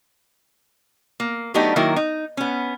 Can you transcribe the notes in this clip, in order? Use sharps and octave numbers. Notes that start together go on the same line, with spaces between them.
A#3
F#3 A3 B3 D4 D#4 G4
D#3 F#3 A#3 E4 A#4
D#4
B3 C#4